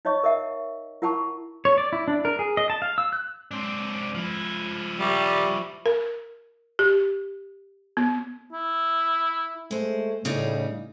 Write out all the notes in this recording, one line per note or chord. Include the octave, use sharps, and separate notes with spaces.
D#4 C#5 D#5 C#6
A#4 D#5 E5 F#5
E4 A#4 F#5 A5 B5 C#6
C#5
D5
E4
D4
A#4
G#4
D#5
A5
F5
E6
F#6
G#3 C4 D4 C6
F3 E4
G3 E5 C#6 D6
A#4
G4
B3
E4
G#3 A3 C5
A2 C#3 G3 D#4